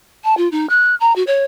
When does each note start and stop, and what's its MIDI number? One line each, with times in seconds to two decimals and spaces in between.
0.24 0.36 81
0.37 0.48 65
0.51 0.68 63
0.69 0.95 90
1.00 1.15 82
1.15 1.23 66
1.27 1.44 73